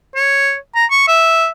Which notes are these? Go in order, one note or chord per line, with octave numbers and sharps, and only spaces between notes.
C#5
A#5
C#6
E5